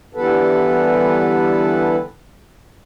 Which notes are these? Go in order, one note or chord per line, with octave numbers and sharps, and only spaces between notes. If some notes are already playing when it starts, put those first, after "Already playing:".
D3 E3 G3 B3 A4 B4